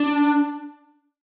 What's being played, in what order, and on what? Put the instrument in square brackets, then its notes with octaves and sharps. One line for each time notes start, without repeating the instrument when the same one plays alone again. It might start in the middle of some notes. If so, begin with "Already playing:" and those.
Already playing: [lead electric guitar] D4